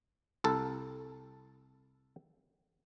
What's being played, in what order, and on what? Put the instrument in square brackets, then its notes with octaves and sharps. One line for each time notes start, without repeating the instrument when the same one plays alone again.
[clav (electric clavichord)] C2 A4